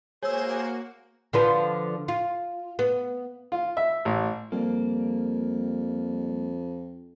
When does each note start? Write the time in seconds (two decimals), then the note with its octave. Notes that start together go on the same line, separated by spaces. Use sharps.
0.23 A#3 F#4 G#4 C5 C#5 E6
1.33 D3 F3 B4
2.08 F4
2.79 B3
3.52 F4
3.77 E5
4.05 A1
4.52 F2 G3 A#3